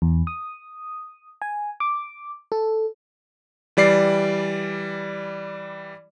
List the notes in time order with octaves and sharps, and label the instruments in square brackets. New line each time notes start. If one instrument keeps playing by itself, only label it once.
[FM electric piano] E2
D#6
G#5
D6
A4
[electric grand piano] E3 G3 D5 C7